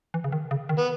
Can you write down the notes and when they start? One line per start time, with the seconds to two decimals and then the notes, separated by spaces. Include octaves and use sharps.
0.14 E3
0.24 C#3
0.32 D#3
0.51 C#3
0.69 D#3
0.78 B3